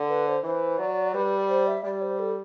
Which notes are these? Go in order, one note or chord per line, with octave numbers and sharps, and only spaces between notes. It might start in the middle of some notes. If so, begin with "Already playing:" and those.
Already playing: D3
B4
C5
E3 C5
F#3 D5
G3 B4
C5
E5
G3 D5
C5
A4